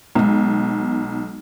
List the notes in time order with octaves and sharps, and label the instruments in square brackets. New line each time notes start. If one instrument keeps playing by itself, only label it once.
[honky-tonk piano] B1 [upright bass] G#3 B3